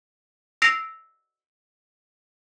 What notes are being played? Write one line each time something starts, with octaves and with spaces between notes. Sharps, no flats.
E6 A#6 C7 D7 F7